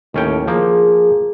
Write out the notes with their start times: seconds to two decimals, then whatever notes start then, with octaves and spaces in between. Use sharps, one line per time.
0.14 D#2 A2 C#4 G5
0.48 F3 A#3 G#4